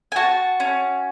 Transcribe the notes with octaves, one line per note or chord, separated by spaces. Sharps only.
G#5
F#4 A5
C#4